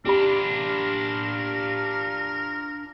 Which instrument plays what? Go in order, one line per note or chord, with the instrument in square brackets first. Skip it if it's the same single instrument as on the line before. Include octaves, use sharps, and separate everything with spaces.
[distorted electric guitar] D4 F4 [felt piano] G4 B5 [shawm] A#4